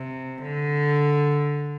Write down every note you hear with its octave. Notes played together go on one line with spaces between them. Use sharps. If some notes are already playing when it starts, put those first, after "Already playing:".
Already playing: C3
D3